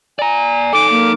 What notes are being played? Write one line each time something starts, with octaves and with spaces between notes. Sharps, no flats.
D5 G#5 A#5
D#4 A4 D6
A#3